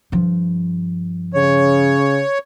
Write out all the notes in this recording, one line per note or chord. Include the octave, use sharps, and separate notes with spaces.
G2 F3
C#3 C#5